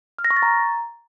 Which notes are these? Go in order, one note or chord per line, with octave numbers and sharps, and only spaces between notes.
F6
A#6
C#6
A6
A#5